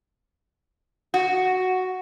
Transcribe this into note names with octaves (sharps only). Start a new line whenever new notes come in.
F#4